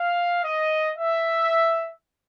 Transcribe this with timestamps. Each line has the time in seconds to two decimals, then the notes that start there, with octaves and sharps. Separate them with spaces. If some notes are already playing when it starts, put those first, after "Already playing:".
Already playing: F5
0.44 D#5
0.96 E5